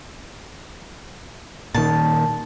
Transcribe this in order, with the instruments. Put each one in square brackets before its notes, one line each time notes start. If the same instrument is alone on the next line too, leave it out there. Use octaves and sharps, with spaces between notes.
[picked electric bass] A#2 D#3 [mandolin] A5